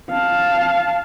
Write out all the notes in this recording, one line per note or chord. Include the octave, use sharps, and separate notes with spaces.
F5 A5